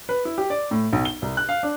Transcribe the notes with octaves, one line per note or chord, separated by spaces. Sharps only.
B4
E4
G4
D5
A2
B1
G7
C2
F#6
F5
D4